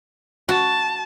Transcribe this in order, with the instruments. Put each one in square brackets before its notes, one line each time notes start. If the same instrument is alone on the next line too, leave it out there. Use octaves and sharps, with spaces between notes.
[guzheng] F#4 [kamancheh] A5